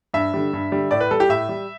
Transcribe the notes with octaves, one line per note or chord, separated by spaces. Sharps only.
G2 E5
D3 G3
G2
D3 G3
A2 D5
B4
G3 A4
G4
A2 E5
G3